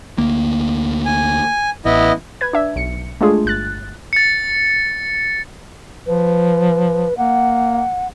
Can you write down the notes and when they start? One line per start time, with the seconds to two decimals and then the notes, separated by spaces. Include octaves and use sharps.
0.18 D2 A#3
1.06 G#5
1.85 A1 B3 E4 D#5
2.41 B4 G#6
2.53 D4 E5
2.76 B1 C#7
3.21 G#3 A3 D4 F4 G#4
3.45 G1 F#6 A6
4.13 A6 C#7
6.07 F3 B4
7.18 A#3 F#5